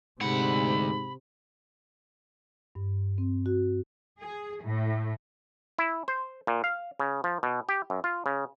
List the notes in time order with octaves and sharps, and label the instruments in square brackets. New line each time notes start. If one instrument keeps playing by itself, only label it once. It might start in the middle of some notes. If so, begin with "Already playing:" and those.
[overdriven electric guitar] D2 F#5 [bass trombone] G#2 [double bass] C3 [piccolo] B5
[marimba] G2
C4
F#4
[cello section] G#4
A2
[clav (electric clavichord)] E4
C5
A#2
F5
C#3
F3
B2
G4
F#2
F4
C#3